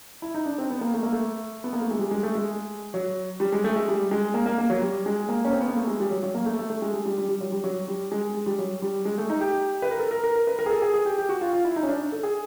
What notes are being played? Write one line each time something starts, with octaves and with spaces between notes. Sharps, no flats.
E4
D#4
D4
C4
B3
A#3
A3
A#3
A3
B3
A#3
A3
G#3
G3
G#3
A3
G#3
F#3
G3
G#3
A3
G#3
G3
G#3
A#3
A#3
A#3
F#3
G3
G#3
A#3
C#4
C4
B3
A#3
A3
G#3
G3
F#3
F#3
A#3
A3
A3
A3
G#3
G3
G3
G3
G3
F#3
G3
F#3
G3
G#3
G#3
G3
F#3
G3
G#3
A3
D#4
G4
B4
A#4
A4
A#4
A#4
A#4
B4
A#4
G#4
A4
G#4
G#4
G4
G4
F#4
F4
F4
E4
D#4
C#4
D4
A4
G#4